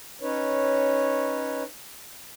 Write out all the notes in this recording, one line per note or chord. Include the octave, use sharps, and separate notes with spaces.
C#4 D#4 B4 C#5